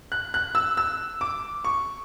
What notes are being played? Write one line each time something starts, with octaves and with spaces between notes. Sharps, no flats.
F#6
F#6
E6
E6
D6
C#6